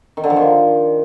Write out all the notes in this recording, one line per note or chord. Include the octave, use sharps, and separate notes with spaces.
D#3
D3
F3
D#3